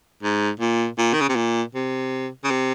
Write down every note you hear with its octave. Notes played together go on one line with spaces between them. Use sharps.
G#2
A#2
A#2
D#3
C#3
C3
A#2
C3
C#3
C3